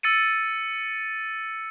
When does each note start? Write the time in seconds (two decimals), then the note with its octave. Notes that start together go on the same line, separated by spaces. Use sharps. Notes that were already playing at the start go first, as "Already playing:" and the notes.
0.03 E6 A6 C#7 D#7